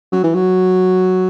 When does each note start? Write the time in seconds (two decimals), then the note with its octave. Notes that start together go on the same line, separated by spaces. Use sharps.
0.12 F#3
0.24 E3
0.34 F#3